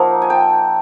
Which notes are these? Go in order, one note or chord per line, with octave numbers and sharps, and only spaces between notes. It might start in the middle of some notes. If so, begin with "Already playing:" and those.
Already playing: F3 A#3 D#4 E5 F#5
G#5
G5 A5